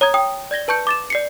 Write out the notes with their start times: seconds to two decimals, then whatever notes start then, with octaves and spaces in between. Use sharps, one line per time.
0.01 C#5 A#5 D#6 G#6
0.14 G5 D#6
0.51 D5 G#6 A#6 G7
0.68 B4 A5 C#6 G6 C#7
0.87 D6 A6 E7
1.10 D5 C7 C#7